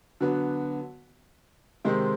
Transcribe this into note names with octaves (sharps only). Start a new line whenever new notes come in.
D3 F#3 B3
C3 D#3 G#3 C4